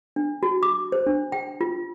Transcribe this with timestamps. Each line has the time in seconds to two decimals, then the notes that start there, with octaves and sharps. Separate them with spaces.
0.16 D4
0.43 F#4
0.63 D6
0.92 C5
1.06 D4
1.32 G5
1.61 F4